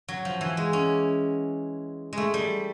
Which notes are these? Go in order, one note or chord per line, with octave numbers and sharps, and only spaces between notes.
F#3
F3
E3
G#3
C#4
G#3 A3
G3